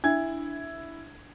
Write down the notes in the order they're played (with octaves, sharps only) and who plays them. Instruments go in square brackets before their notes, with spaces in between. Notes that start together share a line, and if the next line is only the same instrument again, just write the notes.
[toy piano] D4 [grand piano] E4 G#6